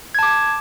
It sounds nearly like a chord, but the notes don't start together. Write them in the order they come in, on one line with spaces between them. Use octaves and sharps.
G#6 A5 D6